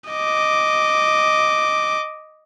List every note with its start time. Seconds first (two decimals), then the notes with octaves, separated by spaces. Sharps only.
0.10 D#5 D6